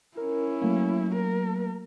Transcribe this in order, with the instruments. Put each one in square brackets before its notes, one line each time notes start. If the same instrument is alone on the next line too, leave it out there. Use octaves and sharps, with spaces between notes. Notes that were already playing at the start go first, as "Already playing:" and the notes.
[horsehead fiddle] C#4 E4 [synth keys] A#4
[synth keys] F#3 A3 A#3
[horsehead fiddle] A#4